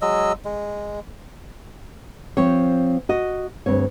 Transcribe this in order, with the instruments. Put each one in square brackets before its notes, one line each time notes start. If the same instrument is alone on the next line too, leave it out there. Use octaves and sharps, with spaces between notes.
[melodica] F#3 G#3 D#5 E6
G#3
[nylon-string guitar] F3 C4 C#5
F#4 D#5
D2 G2 C4 C#5